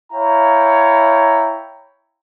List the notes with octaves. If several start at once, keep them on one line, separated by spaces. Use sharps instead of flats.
E4 C#5 F5 G5 A#5